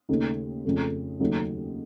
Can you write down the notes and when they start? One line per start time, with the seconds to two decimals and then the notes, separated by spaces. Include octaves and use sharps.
0.09 D#2 C#3 A3 D#4
0.65 F2 C#3 A3
1.20 D#2 C#3 F#3 A3 D#4